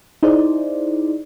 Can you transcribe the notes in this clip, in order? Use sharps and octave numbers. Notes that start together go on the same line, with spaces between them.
D#4 E4 G#4 C5 D5